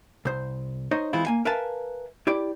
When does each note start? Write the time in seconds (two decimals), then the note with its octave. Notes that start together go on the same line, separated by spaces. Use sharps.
0.25 C2 C5
0.91 D#4 C5 C#5 D#5
1.13 E3 G#3 C4 E4 F4
1.27 A#3 G#5
1.45 A#4 B4 E5 F5 G#5 A5
2.27 E4 G4 D5